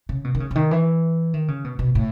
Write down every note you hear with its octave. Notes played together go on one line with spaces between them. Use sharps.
C#3
B2
D#3
C#3
C#3
D#3
E3
D#3
C#3
B2
B2
A2